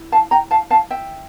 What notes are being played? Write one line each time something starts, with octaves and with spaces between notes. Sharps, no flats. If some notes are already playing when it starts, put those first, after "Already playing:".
Already playing: E4
F5 A5
G5 A#5
F5 A5
F5 A5
E5 G5